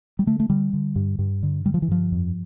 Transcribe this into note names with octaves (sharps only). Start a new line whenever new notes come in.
G3
D3 A3
A3
D3 G3
D3
G2
G2
D3
D3 G3
F3
E3
G2 F3
F2